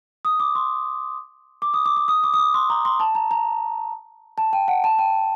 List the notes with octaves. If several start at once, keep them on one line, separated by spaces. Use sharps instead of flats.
D#6
D6
C6
D6
D#6
D6
D6
D#6
D6
D#6
D6
C6
A#5
C6
A5
A#5
A#5
A5
G5
F#5
A5
G5